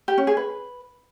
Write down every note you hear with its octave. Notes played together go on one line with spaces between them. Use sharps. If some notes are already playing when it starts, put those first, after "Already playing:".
G4
C#4
G#4
B4